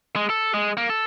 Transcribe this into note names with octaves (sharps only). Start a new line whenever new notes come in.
G#3
A4
G#3
A#3
A4